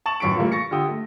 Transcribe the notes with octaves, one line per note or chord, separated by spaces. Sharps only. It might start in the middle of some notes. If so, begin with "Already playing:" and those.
A5 C#6 A6 E7 F#7
A1 F#2 C#6 B6 D7
A#2 C#3 E3 G3 A3 A#3
C#6 A6 A#6 C#7
D3 F4 G4 G5 D#6 E6
A3